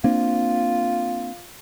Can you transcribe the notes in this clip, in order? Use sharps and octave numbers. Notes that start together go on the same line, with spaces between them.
A#3 C4 D4 F4